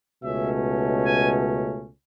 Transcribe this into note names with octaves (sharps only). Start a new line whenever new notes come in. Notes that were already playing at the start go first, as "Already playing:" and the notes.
C#2 B2 A3 C#4 E5
G#5